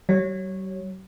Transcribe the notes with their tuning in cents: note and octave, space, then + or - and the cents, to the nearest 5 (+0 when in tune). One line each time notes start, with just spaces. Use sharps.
G3 -45 C#5 -10